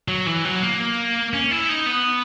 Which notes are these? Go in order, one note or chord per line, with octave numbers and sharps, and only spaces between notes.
F#3
E3
F#3
A#3
C#4
E4
D#4
B3